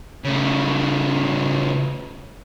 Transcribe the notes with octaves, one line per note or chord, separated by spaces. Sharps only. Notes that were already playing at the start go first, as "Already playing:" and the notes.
C#3 A3